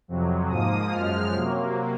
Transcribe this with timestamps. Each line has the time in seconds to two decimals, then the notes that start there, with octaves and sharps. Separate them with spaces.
0.08 F2 C3 F#3
0.50 G#2 F3 A#3 D#6
0.92 F#2 F3 G#3 F6
1.33 C3 F#3 A#3